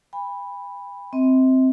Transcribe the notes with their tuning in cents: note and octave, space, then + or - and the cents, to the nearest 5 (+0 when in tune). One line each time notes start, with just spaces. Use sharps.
G5 +45 B5 +0
C4 +0 E5 -45